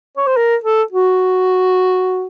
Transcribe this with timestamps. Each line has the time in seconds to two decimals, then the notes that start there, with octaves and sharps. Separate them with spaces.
0.17 C#5
0.27 C5
0.37 A#4
0.64 A4
0.92 F#4